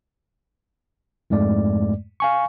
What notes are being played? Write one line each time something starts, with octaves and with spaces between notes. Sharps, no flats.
F2 G#2 G#3 A3 D5
F5 G#5 C#6